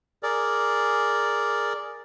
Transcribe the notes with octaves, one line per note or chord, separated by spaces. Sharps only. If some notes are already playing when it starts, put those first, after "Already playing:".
G#4 A#4 D5